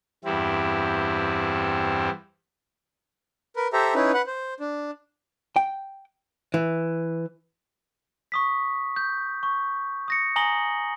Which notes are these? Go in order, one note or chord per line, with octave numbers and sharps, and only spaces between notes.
E2 G2 G3 C4 E4
A#4 B4
G4 A4 C5 E5 A#5
C#4 D#4 E4 B4
B4 F#5
C5
D4
G5
E3
C#6 D#6 B6
G6
C#6
D#6 A#6 C#7
G#5 A#5 D#6 A#6 F#7 G7